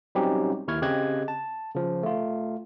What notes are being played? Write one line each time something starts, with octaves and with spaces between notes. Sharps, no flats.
F#3 G3 C4 C#4 D#4 G4
D#2 E4 C#6 F6 G#6
C#3 C4 G4 D#5 F#6 G#6
A5
C#3 F3
A3 F4